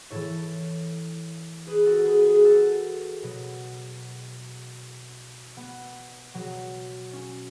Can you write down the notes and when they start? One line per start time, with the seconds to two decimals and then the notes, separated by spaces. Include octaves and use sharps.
0.10 A2 E3 A4 C#5
1.66 G#4 B4
1.86 F#4 A4
2.05 G#4 B4
2.25 G#4 B4
2.44 F#4 A4
3.23 B2 F#3
5.57 B3
6.34 B2 F#3
7.13 C#4